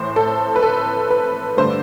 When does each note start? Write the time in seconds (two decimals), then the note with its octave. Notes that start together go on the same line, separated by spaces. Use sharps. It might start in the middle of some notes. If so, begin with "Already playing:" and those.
Already playing: A2 E3 C5
0.16 A4
0.56 B4
0.62 A4
1.11 B4
1.57 G2 D3 A3 C5